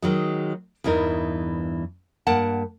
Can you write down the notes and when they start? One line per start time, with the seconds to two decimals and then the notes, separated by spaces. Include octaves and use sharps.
0.02 D#3 F#3 G#3
0.84 E2 G2 E3 D#4 A#4
2.27 G2 A#3 F#5 A5